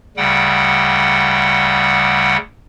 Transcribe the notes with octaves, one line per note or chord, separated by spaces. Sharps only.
D2 C#3 G3 F#5 G5